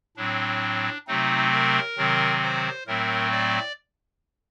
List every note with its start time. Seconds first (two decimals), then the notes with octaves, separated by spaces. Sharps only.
0.16 A2 F#3 C4 D4
1.07 C3 F#3 A3 C4 D#4
1.52 A#4
1.97 C3 D#3 F#3 C4
2.43 C5
2.87 A2 F#3 A3 C4 A#4
3.32 D5